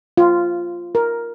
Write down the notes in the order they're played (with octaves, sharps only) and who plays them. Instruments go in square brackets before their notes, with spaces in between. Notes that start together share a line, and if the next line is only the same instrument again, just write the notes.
[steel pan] F4
A#4